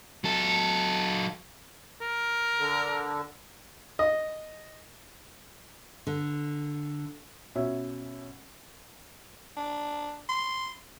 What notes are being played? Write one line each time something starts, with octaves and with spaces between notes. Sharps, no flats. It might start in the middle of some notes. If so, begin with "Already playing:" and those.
F#3 A4
A#4
D3
D#5
D3
B2 C#4 E5
D4
C6